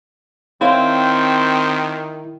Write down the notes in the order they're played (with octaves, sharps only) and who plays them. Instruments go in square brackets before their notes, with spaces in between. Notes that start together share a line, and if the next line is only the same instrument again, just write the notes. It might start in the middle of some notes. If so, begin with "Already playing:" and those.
[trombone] D#3 [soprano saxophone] C4 [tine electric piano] E4 [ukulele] C#5 F5